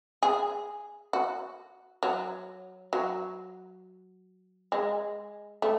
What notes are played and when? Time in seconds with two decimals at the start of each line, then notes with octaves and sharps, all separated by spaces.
0.23 G#4
1.13 F#4
2.03 F#3
2.93 F#3
4.72 G#3
5.62 A3